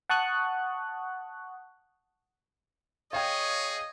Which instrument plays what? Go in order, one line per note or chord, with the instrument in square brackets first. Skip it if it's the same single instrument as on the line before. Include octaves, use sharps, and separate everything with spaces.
[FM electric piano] F#5 A5 C#6 D#6 F#6
[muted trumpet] G#4 [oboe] C#5 [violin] D#5 [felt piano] F5 G5